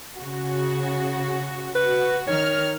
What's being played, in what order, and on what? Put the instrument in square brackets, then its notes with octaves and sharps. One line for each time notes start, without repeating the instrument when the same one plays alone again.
[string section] C#3 F#4
[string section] F#4 [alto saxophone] B4
[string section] D#3 F6 [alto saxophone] C#5